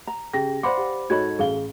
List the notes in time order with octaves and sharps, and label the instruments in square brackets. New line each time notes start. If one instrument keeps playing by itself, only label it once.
[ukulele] A#5
[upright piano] C#3 G4 A#6 [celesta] G#4 G5
[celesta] C5 B5 D6 [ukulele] D5 F5 F#5 [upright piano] C6
[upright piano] G4
[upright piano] G#2 C#5 D#5 [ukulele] F#4 A4 B5 [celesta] G#6
[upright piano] A1 F5 G7 [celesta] G#4